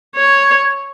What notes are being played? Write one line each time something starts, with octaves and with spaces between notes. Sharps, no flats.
C#5